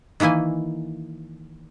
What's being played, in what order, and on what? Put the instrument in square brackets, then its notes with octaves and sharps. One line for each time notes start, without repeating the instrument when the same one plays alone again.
[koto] D#3 E3 A#3 E4 G#5